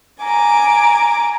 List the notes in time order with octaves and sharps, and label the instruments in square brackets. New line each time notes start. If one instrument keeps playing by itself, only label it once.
[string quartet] G#5 D6 [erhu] A#5